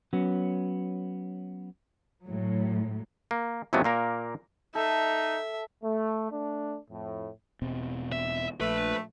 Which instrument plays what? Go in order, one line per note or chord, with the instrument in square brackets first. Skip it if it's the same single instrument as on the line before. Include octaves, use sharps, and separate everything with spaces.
[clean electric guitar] F#3 B3 C#4
[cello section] A2 F#3
[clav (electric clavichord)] A#3
F2 C3 E3 F#3 A3 B3
A#2 A#3 A#4
[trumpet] D#4 [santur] A4 [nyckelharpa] E5
[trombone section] A3
A3 D4
F2 A2
[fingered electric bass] E1 B2 C4
[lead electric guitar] E5
[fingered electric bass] A#1 [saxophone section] A3 [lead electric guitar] B4